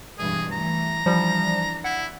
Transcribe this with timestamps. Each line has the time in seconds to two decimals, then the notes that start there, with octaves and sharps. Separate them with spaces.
0.19 G2 B2 E3 G#4
0.52 E3 A3 A#5
1.06 E3 F3 G3 D4
1.84 E4 F#5